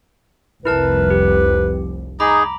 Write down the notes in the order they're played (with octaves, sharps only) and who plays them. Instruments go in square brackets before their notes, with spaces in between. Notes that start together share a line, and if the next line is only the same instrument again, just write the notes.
[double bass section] F1 C2 [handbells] E4 A#4 A5 [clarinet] B4
[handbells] G4
[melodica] D#4 G#4 [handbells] A#5 B5 D6